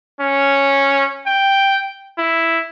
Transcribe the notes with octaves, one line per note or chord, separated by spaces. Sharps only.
C#4
G5
E4